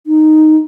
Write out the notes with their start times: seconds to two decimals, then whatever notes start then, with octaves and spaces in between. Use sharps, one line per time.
0.07 D#4